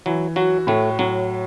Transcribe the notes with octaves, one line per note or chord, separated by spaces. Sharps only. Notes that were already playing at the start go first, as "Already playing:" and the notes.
E3 F#3
F#3 F#4
A2 A3
A2 F#3